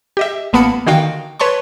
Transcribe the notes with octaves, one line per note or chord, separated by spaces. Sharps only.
G4 D#5 E5
A1 A#3 B3 A5 B5 C#7
D3 D#3 F#4 F5 G5
B4 C#5 A5 C6 C#6